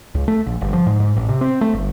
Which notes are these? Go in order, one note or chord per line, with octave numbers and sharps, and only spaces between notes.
C#2
A3
A#1
G1
F3
G#2
G#2
A1
C3
C4
A3
G1